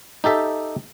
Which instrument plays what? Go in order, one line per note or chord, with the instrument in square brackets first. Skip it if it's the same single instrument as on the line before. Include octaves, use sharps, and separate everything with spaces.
[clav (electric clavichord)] D#4 G4 A4 E5